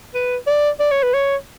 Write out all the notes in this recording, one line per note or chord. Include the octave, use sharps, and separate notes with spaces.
B4
D5
D5
C#5
B4
C#5